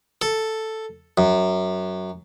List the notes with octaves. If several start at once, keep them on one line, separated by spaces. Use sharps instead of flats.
A4
F#2